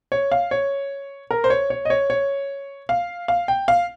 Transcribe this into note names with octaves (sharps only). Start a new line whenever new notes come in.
C#5
F5
C#5
A#4
C5
C#5
C#5
D#5
C#5
C#5
F5
F5
G5
F5